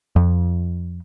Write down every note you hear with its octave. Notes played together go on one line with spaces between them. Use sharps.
F2